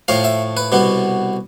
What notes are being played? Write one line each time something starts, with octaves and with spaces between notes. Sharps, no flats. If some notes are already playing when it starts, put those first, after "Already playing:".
A2 F3 A3 F5
E5
B4
C2 B2 B3